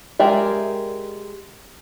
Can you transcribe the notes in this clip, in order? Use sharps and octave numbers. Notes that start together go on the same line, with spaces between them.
G#3 G4 A#4 D5 E5